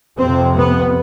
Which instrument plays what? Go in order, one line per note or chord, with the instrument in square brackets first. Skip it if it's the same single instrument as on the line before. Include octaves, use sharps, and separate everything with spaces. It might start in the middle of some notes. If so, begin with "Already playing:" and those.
[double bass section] F2 C3 C4
B3